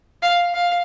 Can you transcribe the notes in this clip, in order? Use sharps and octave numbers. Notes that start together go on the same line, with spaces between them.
F5
F5